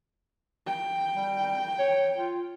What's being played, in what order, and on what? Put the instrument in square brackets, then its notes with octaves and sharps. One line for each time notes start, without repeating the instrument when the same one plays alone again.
[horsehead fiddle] G5
[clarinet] G3
C#5
F4